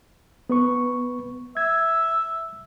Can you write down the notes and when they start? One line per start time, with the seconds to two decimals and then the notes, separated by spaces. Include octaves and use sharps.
0.50 B3 B4 C#6
1.57 E5 G#6